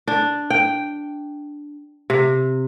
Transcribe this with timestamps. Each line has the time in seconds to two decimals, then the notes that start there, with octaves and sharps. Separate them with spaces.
0.08 D4
0.50 G5
2.10 C3